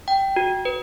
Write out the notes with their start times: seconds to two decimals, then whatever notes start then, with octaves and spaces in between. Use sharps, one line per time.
0.08 G5
0.36 F#4
0.65 B4